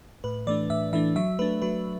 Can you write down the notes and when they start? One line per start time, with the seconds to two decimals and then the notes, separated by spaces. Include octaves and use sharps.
0.24 A2 B4
0.47 E3 A3 D4 D5
0.70 A2 E5
0.93 E3 A3 D4 E5
1.16 F#3 E5
1.39 A3 D4 B4
1.62 F#3 B4